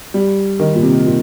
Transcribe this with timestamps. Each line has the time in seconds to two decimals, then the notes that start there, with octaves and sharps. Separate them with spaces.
0.14 G3
0.59 D#3
0.75 A#2
0.82 C3
1.06 A#2